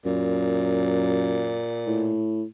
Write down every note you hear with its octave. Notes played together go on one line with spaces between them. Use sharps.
F#2 A#2
A2